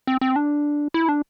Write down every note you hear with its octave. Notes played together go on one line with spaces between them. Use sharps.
C4
C4
D4
E4
D4